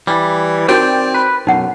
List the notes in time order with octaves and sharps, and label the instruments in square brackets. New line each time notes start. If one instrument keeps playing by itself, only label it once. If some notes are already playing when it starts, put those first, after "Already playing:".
[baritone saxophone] E3 [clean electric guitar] G3
[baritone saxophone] C4 [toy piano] D#4 F#4 A#4 [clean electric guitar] D5 G5
[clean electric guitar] B4
[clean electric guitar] B1 [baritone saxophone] F#2 [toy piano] D#4 F#5